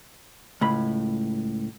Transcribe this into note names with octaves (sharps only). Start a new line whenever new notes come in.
C#2 A2 B5